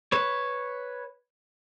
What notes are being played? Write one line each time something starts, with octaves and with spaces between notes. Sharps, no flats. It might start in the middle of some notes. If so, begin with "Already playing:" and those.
B4 C#5